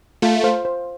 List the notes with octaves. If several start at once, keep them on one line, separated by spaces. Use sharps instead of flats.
A3 F4
C5 F5
C5